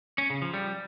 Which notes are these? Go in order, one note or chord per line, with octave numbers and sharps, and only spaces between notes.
C#4
C#3
F3
G3